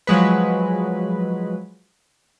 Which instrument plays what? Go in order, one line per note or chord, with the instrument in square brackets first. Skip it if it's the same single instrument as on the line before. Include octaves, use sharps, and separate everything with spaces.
[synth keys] F3 F#3 G#3 B4